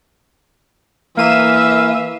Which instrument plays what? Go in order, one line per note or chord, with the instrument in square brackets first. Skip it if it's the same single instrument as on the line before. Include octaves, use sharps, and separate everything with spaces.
[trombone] E3 [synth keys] A#3 D#7 E7 [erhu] E5 [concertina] F5